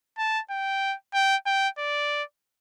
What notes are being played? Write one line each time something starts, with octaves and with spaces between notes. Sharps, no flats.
A5
G5
G5
G5
D5